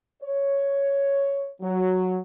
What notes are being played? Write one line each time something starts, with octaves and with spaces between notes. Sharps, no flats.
C#5
F#3